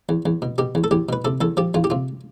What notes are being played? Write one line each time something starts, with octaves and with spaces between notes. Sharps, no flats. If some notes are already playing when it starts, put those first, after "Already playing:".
E2
E2
B2
B2 G4
E2
A4
E2 G4
B2 B4
C3 A4
E2 A4
F3 G4
E2 F4
G4
C3 F4